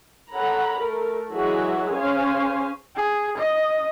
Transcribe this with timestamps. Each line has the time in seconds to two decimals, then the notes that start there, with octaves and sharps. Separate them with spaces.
0.32 A4 C#5 F#5 A#5 B5
0.78 A3 A4 A#4
1.32 E3 F#3 G#3 F#4 G#4 E5
1.96 C#4 G#4 C5 C#5 F5 G#5
2.96 G#4
3.38 D#5